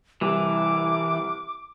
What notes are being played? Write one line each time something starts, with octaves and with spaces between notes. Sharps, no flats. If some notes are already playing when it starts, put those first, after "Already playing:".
C2 E3 D6